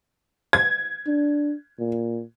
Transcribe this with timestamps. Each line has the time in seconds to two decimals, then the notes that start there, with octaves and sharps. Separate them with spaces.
0.53 G#6
1.07 D4
1.79 A#2